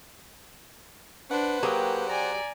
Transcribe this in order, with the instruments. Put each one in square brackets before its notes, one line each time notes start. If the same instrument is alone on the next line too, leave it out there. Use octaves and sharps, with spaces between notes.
[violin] D4 [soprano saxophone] B4 [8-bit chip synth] C5 F#5
[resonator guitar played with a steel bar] F#3 G4 G#4 [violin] A#3
[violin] D5 G#5 [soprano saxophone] A#5